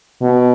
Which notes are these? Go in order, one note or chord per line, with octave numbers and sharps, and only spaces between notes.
B2